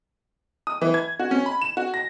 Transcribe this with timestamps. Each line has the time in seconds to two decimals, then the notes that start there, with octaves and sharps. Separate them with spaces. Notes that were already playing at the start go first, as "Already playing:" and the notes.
0.67 D#6
0.81 E3
0.94 G#6
1.20 F#4
1.31 C#4
1.46 B5
1.62 E7
1.77 F#4
1.94 A#6